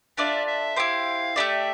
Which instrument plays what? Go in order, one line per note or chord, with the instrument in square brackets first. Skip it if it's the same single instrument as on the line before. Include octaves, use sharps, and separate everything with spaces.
[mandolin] D4 F4 A4 D5 [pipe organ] E5
[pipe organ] E5
[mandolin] E4 G4 C5 [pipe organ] F5
[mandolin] A3 D4 G4 D5 [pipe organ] E5